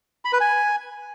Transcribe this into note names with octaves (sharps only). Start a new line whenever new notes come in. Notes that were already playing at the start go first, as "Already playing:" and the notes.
B5
B4
G#5